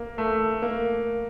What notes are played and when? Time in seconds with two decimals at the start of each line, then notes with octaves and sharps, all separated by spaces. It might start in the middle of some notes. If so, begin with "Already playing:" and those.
Already playing: A#3
0.18 A3
0.62 A#3